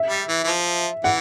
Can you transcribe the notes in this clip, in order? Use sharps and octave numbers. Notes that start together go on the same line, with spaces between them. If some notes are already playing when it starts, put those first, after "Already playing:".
Already playing: E5
G3
E3
E3
F3
E3 F#5